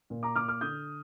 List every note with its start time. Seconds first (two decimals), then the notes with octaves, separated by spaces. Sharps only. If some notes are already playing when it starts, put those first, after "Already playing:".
0.10 A#2
0.23 A#5 D6
0.35 A#2 D6 F6
0.48 D6 F6
0.61 D3 D#6 G6